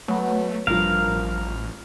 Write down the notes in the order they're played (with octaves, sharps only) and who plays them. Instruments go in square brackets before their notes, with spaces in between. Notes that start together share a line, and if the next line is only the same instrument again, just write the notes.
[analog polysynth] F#3 B3 [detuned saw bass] A3
[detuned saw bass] A1 [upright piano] G2 F3 [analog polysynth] A#4 [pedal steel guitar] F5